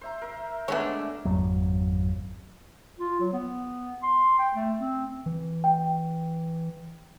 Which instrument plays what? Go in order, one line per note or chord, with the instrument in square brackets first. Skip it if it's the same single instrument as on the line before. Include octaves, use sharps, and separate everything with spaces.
[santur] C5 E5 A#5
A#4 E5
[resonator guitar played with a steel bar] G#3 A3 D4 [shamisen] B3 C#5 [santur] E5
[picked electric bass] G#1 F2 F#3
[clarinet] F4
F#3
B3
C6
G5
A3
C4
[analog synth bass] E3
[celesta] G5